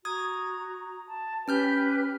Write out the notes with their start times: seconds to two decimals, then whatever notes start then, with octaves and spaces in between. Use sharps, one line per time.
0.05 F#4 A#5 D#6 G#6
1.07 A5
1.48 C#4 G4 B4 G5 F6 G6